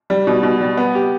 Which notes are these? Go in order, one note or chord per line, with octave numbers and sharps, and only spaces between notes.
G3
B2
B2
G3
B3
G4